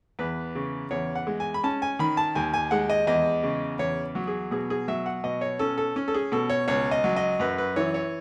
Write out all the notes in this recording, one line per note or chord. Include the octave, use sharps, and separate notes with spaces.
E2 B4
C#3
E2 C#5
F#5
G#3
G#5
B5
C#4 A5
G#5
D#3 B5
A5
D#2 G#5
G#5
G#3 F#5
D#5
E2 D#5
C#3
E2 C#5
F#3
G#4
B2 G#4
G#4
F#3 E5
F#5
B2 D#5
C#5
C#4 A4
A4
C#4
A4
G#4
B2 A4
C#5
C#2 C#5
D#5
F#3
D#5
F#2 B4
B4
E3 C#5
C#5